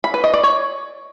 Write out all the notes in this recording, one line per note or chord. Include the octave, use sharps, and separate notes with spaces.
B5
B4
D#5
D5
C#5